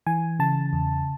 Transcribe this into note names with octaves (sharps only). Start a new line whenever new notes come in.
E3 G#5
C#3 A5
E2